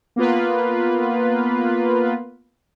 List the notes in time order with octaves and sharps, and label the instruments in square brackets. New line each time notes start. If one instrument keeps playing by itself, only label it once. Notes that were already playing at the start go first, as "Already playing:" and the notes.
[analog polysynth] A#3 B3 F4 B4